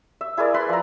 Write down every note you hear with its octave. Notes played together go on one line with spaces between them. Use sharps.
E5
E4 G#4 A#4 D5
B4 B5 C6
F3 A#5